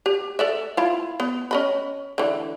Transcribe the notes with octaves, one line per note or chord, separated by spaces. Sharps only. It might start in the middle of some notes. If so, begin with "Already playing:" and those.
G4
A4 D5 E5
E4 F4
B3
C#4 D#5 B5
D3 E3